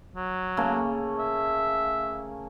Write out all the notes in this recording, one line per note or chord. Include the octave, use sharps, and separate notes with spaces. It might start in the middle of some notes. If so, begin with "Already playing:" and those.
F#3
C#3 A3 A#3
E5